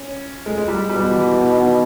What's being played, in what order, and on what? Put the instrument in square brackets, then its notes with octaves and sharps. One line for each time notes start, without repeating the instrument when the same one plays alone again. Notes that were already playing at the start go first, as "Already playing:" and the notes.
Already playing: [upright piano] C#4
G#3
G#3
G3
[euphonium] B2 [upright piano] G3
[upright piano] E3
E3
D#3